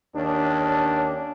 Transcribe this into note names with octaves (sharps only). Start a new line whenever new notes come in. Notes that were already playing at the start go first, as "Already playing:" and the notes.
D#2 C#4 D4